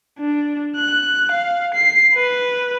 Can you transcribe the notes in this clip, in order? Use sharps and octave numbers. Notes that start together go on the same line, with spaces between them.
D4
F#6
F5
C7
B4